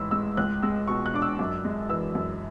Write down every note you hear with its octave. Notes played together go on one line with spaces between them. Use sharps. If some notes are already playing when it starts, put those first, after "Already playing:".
Already playing: A1 G#2 E3 B5 E6
G#3 E6
C#2 F#6
G#3 E6
B2 C#6
F#6
D4 D6
E6
F#2
G#3
E3 E6
F#2